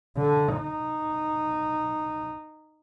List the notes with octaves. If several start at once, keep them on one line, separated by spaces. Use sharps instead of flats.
D3
D#4